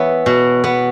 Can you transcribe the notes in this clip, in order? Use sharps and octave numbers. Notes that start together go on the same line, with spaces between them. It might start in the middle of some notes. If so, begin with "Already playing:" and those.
Already playing: E3 B3 C#5 E5
B2
B3